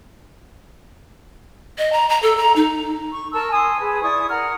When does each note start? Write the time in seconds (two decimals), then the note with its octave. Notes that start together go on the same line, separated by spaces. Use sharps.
1.78 D#5
1.93 A#5
2.09 A#5
2.23 A4
2.38 A#5
2.56 D#4
3.12 C#6
3.33 A#4 A5 C#6 E6
3.52 G#5 C6 D#6
3.80 G#4 B4
4.02 E4 D5 C#6 D#6
4.30 A#4 F#5 A#5 F6